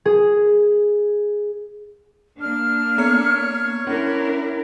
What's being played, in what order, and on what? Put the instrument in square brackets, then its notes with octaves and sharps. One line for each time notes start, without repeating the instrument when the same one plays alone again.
[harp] G#4
[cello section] A#3 D4 [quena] F6
[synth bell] B3 C#7 [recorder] C#5
[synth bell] C#4 [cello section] D4 E4 A#4